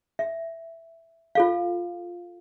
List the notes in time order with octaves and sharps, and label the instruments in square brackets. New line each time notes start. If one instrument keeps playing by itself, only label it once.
[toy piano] E5
F4 A4 F5